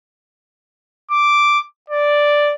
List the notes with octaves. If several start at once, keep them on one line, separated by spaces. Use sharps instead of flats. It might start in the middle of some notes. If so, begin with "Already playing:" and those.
D6
D5